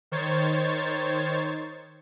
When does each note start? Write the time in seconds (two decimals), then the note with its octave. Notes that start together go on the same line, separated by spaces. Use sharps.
0.12 D#3 C5 C#5 G#6 A6